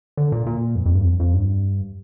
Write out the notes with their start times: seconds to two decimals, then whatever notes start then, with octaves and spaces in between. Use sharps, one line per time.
0.17 D3
0.32 A#2
0.47 A#2
0.75 F2
0.86 F2
0.94 G2
1.04 F2
1.20 F2
1.34 G2